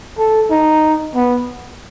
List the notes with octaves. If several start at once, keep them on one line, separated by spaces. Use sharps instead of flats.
A4
D#4
B3